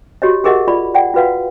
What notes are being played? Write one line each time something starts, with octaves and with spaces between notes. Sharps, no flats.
F#4 G4 C#5 D#5
G4 G#4 A#4 D#5 E5 F#5
F4 D5 B5
D5 F#5 G5
F4 F#4 B4 F5 F#5